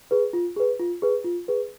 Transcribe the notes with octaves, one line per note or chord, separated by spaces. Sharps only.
G#4 B4
F4
G#4 B4
F4
G#4 B4
F4
G#4 B4